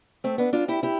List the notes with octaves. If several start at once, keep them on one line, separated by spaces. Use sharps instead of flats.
A3 C4
B3 D4
D4 F4
E4 G4
E4 G4